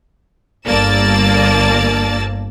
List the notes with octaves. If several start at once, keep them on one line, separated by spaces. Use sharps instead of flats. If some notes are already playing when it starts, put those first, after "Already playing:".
G1 A#3 D5 A5 E6 A6